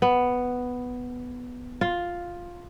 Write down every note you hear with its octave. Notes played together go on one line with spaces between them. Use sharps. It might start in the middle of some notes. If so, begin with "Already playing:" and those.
B3
F4